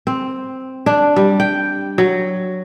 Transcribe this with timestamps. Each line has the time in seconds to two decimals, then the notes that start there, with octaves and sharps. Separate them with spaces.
0.07 C4
0.86 D4
1.16 G3
1.40 G5
1.98 F#3